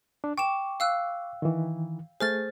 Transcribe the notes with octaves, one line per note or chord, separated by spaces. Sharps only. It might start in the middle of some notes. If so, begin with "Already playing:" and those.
D4
G5 C#6 D6 E7
F5 E6 F#6
D#3 E3
A3 G#4 C5 F6 A6